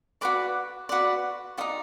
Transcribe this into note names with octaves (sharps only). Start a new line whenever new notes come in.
F#4 B4 D5 D6
F#4 B4 D5
D#4 F#4 D5 D#6